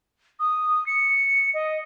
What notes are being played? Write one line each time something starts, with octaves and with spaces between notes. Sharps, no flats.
D#6
C#7
D#5